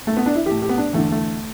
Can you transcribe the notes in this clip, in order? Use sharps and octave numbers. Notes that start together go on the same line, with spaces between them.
A3
B3
D4
E4
A2 E3 G4
G4
B3
D4
E2 D3 A3
A3